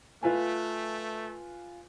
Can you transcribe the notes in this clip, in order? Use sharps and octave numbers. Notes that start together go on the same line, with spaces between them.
A3 F4 B4 G#5